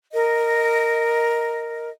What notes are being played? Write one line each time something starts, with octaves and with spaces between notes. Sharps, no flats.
A#4 D#5